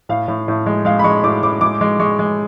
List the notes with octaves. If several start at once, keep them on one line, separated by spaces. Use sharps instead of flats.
A2 F5
A2
A2
G#3
G#3 F5
B5
G#3 C#6
A2 D6
A2 D6
G#3 D6
G#3
G#3 C#6
G#3